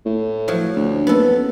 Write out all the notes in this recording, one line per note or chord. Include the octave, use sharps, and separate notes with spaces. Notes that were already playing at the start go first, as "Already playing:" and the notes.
A2
F3 F#3
D2
F#1 B3 A4